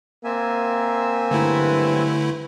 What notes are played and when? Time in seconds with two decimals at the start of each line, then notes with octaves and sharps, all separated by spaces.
0.24 A#3 C4 E5 G#5
1.31 G2 D3 F#3 A3 E4 B4